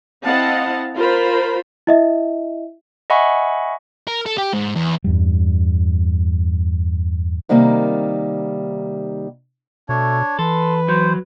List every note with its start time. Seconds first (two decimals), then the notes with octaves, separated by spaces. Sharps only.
0.24 C4 E4 D#5 F5 F#5 A5
0.96 F4 A#4 C5 B5
1.87 E4 D#5 E5
3.10 D#5 E5 F#5 G#5 B5 C#6
4.07 A#4
4.26 A4
4.38 G4
4.53 G#2
4.75 E2
5.04 E2 G2 G3
7.49 C3 D#3 G3 A#3
9.89 B2 A3 D4 C#5
10.39 E3 A4 B4 C6
10.88 F#3 C5